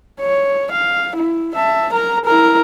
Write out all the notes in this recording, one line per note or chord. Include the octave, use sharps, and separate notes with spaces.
C#5
F5
E4
E5 A5
A#4 A#5
E4 A#4